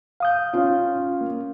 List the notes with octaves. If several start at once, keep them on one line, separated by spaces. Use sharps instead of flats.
F5 D#6 G6
C#4 F4
A#3